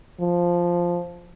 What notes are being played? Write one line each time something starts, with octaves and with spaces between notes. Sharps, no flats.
F3